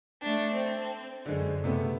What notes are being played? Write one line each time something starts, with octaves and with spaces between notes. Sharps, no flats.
A3 D4
C4
F#2 D3 G#3
C3 A3 B3